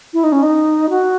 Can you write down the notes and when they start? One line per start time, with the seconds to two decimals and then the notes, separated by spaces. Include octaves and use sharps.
0.14 E4
0.24 D#4
0.32 C#4
0.43 D#4
0.90 F#4